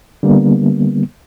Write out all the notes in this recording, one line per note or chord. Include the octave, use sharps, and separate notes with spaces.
D3 G3 A#3 B3